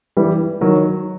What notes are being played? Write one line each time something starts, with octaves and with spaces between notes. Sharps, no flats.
E3 G3
D#3 F#3